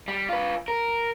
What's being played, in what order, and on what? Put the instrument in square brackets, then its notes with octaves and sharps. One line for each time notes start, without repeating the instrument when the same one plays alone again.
[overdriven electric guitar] G3
F4 B4
A#4